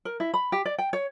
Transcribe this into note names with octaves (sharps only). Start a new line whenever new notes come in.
A#4
E4
B5
G4
D5
G5
C#5